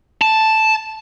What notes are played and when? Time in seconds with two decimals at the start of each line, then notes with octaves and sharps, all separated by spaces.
0.22 A5